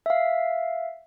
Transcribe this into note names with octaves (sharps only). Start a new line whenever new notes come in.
E5 F5